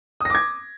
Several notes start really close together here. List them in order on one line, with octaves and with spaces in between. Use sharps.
D#6 A#6 D6 G#6